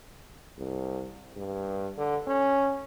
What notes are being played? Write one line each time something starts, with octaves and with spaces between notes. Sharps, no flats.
C2
G2
D3
C#4